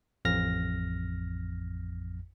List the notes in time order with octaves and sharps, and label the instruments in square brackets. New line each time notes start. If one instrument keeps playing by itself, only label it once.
[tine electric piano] A1 F2 F6 A#6